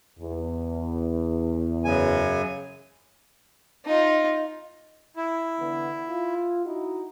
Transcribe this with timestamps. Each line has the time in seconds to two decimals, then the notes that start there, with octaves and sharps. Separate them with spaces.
0.20 E2
1.85 F#2 C#3 G#5
3.85 D#4 F4
5.17 E4
5.60 D3 E3 B3
6.09 F4
6.65 D#4 E4 F#4